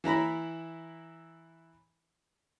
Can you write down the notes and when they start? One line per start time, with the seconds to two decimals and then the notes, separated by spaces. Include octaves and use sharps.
0.04 E3 E4 A#5 B5